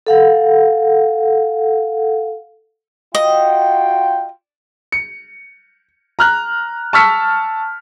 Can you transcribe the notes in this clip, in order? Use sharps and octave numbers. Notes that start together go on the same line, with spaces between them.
A4 F5 F#5
F4 F#4 D#5 G5
C#7
A#5 F6 F#6
A5 C#6 E6 F6 B6 C#7